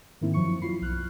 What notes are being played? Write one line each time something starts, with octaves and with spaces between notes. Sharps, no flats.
G#2 D#3 A#3 C4 E4
F#2 F3 F#3 C#6 C#7
F#3 E4 F4 B5 C7
B1 F6 F#6